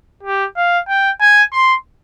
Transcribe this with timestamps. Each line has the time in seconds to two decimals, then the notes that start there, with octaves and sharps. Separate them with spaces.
0.23 G4
0.57 F5
0.88 G5
1.21 G#5
1.53 C6